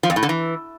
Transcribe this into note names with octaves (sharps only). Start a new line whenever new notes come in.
F3
F2
A2
D3
E3